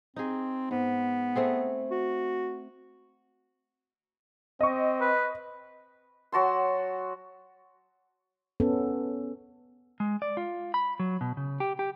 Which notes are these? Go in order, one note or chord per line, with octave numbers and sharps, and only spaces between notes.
C4 D#4 G#4
G#2 B3
A3 C4 G#4
F#4
C4 D#5 C#6
B4
F#3 F#4 A5 C6
B3 C#4 A4
G#3
D5
F4
B5
F#3
B2
C#3
G4
G4